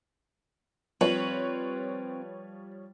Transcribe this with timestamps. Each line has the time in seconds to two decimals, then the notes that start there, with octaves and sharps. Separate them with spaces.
1.01 F3 G3 C4 B4 C#5